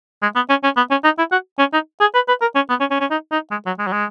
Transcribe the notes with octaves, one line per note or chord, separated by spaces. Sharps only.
G#3
B3
C#4
C#4
B3
C#4
D#4
E4
F#4
C#4
D#4
G#4
B4
B4
A#4
C#4
B3
C#4
C#4
C#4
D#4
D#4
G#3
F#3
G#3
F#3
G#3